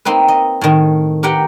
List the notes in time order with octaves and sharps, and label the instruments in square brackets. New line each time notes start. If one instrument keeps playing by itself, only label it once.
[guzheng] A#3 C4 D#4 B4
D#5
A2 D#3
G4 A#4 B4 F#5 G5